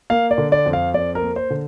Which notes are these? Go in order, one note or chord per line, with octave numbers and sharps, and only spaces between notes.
A#3 F5
D5
D3
D5
F2
F5
F2 D5
A#4
A#3
C5
D3